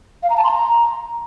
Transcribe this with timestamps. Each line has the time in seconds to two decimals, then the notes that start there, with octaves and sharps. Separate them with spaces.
0.23 F5
0.30 A#5
0.37 A5
0.44 C6
0.51 A#5